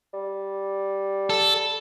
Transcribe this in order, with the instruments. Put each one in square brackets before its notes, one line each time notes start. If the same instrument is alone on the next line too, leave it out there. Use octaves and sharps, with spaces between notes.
[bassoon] G3
[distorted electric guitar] A4